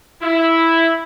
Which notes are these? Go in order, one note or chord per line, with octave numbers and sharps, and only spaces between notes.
E4